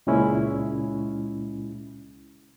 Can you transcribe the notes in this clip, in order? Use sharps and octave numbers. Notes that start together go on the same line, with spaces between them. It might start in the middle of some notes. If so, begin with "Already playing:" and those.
C#2 A#2 G#3 C#4 E4